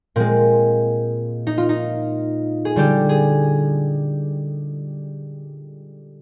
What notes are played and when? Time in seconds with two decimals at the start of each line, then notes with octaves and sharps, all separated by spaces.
0.16 A#2 G#3 C4
1.47 D#4
1.58 F4
1.69 D#4
2.65 G#4
2.76 D3 G3 G4
3.09 G#4